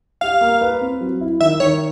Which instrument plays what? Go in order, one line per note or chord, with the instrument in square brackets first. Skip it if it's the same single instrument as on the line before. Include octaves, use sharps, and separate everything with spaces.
[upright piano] G4 [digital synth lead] F5
[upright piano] A#3
B4
C4
F#3
E4
[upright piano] D#3 [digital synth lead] E5
[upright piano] D#3 [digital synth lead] C#5